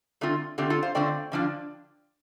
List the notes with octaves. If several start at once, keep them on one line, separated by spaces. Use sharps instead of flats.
D3 A3 C4 F4
D3 A3 C4 F4 G4
F4 A4
C5 F5
D3 A3 C4 F4 D5 G5
D3 F3 D4 F4